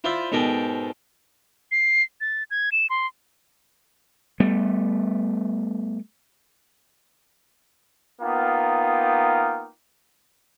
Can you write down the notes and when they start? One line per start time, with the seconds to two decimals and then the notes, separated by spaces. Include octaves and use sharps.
0.04 E4 F4 C5 D5 E5
0.32 G#2 B2 A4 A#4 D5 G5
1.71 C7
2.21 A6
2.51 G#6
2.72 E7
2.90 C6
4.40 G3 A3 B3
8.22 A#3 B3 D#4 F4 G5